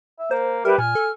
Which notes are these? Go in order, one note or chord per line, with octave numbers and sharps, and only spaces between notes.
E5
A#3 C5
G3 G4 A#4 B4 E5
A#2 G#5 F6
A4